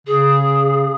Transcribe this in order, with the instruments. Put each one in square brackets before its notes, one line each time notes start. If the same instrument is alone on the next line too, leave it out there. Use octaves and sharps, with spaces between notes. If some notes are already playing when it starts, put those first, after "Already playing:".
[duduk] C#3 [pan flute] G#4